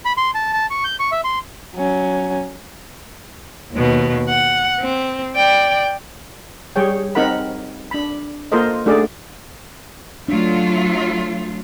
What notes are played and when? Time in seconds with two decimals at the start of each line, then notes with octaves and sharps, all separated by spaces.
0.05 B5
0.17 C6
0.35 A5
0.53 A5
0.70 C#6
0.84 G6
1.00 C#6
1.12 E5
1.24 C6
1.75 F#3 C#4
3.72 D#2 B2
4.30 F#5
4.81 C4
5.36 D5 G5
6.76 G3 G#4 C#5 G5
7.15 C4 D#4 A#4 F#5 B5
7.91 D4 B5
8.52 A#3 F4 A4 A#4 C5 D#5
8.86 A3 D4 D#4 F#4 G#4 D5
10.29 F#3 A3 D4 F4